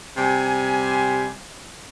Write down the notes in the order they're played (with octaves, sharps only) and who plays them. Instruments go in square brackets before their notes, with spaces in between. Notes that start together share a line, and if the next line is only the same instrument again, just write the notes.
[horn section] C3 G3 G4 G#5